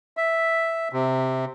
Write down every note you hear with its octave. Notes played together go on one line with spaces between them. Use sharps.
E5
C3